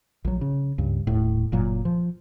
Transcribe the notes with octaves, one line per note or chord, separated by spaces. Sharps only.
A#1 F#3
C#3
C#2 G2
D#1 A2
F#1 A#2 F#3
F3